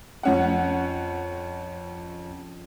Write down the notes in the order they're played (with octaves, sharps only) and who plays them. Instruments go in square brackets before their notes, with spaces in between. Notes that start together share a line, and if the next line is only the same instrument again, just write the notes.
[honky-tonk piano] F2 C#4 F#5